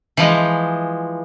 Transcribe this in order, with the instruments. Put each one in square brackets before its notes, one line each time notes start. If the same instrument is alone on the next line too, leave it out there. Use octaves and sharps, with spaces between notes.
[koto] E3 F3 G#3